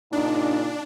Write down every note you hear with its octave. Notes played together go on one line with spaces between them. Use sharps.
A#2 C#3 D4 D#4